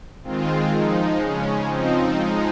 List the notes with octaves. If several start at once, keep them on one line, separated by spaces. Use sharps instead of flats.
D#3 G#3 C4 F4
F3 G#3 D#4
C#3 G#3 C#4
F3 C4 D#4
F3 G#3 D#4